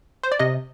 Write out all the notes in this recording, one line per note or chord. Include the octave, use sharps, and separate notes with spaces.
C5
D5
C3 D#5